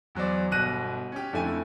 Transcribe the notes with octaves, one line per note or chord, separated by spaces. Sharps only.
E2 F#3 C5 D5
G1 B2 F#6 A#6 D#7
C#4 G4
F2 D3 A3 E4 G#5 D#7